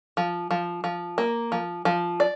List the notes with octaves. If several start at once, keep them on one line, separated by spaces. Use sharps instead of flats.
F3
F3
F3
A#3
F3
F3
D5